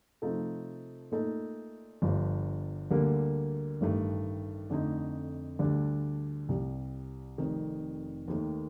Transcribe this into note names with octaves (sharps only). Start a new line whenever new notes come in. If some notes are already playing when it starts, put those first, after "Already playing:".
C3 F3 A3 D#4 A4
A#2 A3 D#4 A4
G1 G2 F3
D2 D3 G3 A#3
A1 G2 D#3 A3
F2 D3 A3 D#4
D2 D3 G3 D4
C2 C3 G3
F1 F2 C3 D#3
D#2 D#3 A3